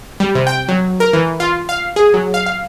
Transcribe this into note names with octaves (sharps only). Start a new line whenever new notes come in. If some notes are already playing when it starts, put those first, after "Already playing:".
G3
C3
G5
F#3
A#4
E3
F4
F5
G#4
F#3
F5
F5